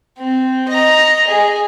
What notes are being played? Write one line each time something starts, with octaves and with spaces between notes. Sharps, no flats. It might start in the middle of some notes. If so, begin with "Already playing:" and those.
C4
D#5 A#5
G#4